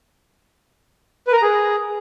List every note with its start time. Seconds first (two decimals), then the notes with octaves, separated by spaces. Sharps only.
1.27 B4
1.32 A#4
1.37 A#5
1.42 G#4